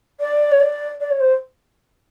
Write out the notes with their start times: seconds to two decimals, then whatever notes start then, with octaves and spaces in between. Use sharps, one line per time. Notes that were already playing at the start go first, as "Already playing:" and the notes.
0.20 D5
0.52 C#5
0.60 D5
1.00 D5
1.10 C#5
1.20 C5